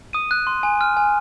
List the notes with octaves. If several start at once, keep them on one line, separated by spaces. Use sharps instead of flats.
D#6 D#7
F#6
C6
G#5
F6
G#5